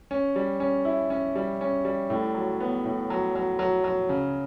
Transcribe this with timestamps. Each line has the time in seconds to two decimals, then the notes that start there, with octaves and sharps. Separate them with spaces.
0.11 C#4
0.36 G3
0.60 C#4
0.85 E4
1.10 C#4
1.35 G3
1.61 C#4
1.85 G3
2.10 A2
2.34 F#3
2.60 B3
2.85 A2
3.10 F#3
3.35 F#3
3.59 F#3
3.84 F#3
4.09 C#3